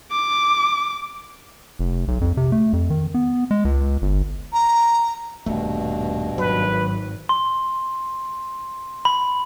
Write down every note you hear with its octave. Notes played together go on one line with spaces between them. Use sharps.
D6
F1
B1
F2
C3
A3
F2
D#3
B3
G#3
C#2
G1
A#5
D#1 G2 B2 A3
G#1 F#3 B4
C6
B5